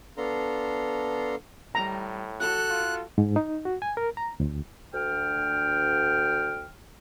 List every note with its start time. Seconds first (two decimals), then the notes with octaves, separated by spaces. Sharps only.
0.17 B3 D4 A4 F5 A#5 C6
1.75 A2 G3 A#5
2.40 F#4 A4 F#6
2.70 F4
3.18 G#2
3.36 D#4
3.65 F#4
3.82 G#5
3.97 A#4
4.17 A#5
4.40 D2
4.94 D2 G5 F6